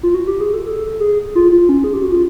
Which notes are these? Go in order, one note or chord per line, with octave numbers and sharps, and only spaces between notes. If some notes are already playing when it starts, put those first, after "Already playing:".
F4
F#4
G4
G#4
A4
A4
G#4
F4
F4
C#4
G#4
G4
F#4
F4